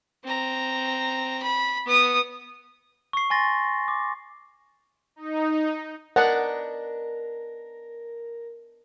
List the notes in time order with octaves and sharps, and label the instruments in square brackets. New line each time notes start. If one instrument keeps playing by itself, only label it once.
[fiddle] C4 A#5
B5
B3 D#6
[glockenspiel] C#6 C7
G#5 C6 A6 A#6
D6
[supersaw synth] D#4
[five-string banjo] B3 D4 D#4 [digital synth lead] A#4 [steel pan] F#5